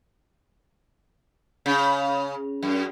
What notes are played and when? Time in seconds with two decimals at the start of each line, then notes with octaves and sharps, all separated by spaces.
1.66 C#3
2.63 F#2